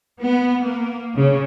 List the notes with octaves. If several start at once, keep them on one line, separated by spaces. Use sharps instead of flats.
B3
A#3
C#3